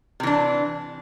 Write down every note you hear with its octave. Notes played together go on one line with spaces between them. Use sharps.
C3 E3 D4